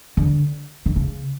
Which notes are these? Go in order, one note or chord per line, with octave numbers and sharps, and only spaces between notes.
D3
D3
C#3